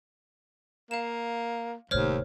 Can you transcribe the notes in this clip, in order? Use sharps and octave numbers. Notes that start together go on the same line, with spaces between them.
A#3 F5 E7
F1 D#2 A2 C5 C#5 F6